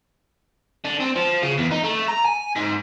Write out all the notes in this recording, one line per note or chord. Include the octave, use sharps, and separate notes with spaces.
D3
C4
F3
C#3
E2
D#4
A3
A#5
G#5
G#2